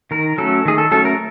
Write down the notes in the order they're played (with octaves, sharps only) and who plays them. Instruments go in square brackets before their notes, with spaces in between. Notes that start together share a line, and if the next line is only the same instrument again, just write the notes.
[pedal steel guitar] D#3 A#4
F#3 A3 C#4 A4
D#3 G#4
A4
F#3 A3 C#4 A4
A#4